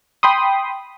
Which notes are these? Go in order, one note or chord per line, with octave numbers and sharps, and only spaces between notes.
G5 B5 C6 D#6